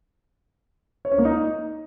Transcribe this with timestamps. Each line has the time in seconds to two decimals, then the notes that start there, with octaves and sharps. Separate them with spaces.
1.05 C#5
1.12 C#4
1.18 A#3
1.25 D#4